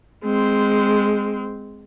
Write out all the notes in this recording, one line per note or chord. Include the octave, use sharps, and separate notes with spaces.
G#3 C4